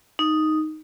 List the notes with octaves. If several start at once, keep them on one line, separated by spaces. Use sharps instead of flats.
D#4